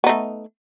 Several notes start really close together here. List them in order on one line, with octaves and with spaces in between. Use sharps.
B3 D#4 A3